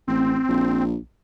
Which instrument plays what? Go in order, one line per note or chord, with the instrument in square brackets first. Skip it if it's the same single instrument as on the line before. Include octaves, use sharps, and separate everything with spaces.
[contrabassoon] A1 [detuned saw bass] C4
[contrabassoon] A#1